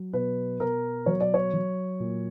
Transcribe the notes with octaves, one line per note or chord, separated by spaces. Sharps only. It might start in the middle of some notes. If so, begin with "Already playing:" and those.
Already playing: F#3
B2 B4
B2 A#4
F#3 C#5
D5
C#5
F#3
A#2